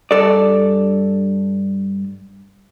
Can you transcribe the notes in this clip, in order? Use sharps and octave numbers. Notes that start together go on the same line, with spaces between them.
G2 A4 D5